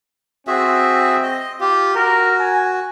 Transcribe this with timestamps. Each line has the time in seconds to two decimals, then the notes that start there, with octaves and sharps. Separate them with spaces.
0.47 C4 F#4 G#4 E5
1.23 D#5
1.60 F4 G4
1.96 F#4 A#4
2.40 G#5